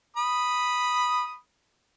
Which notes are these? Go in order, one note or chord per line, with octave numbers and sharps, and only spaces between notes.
B5 D#6